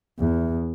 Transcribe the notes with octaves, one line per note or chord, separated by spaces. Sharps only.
E2